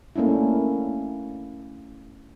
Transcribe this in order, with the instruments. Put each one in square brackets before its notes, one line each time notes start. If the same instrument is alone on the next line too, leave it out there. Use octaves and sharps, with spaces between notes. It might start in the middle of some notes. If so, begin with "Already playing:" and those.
[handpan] A3 A#3 C#4 D4 E4